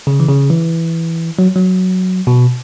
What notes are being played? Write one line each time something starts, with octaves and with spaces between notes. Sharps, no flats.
C#3
E3
C#3
E3
F#3
F#3
B2